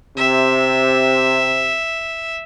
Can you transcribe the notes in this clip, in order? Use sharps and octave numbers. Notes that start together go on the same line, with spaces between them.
C3 E5